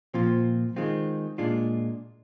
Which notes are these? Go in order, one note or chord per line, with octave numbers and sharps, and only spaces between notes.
A#2 F3 C4 F4
D#3 G#3 C4 F4
A#2 G#3 D4 F4